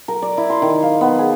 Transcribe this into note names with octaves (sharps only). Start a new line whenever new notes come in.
A#4
D5
E4
C6
D#3
F5
B3
G#4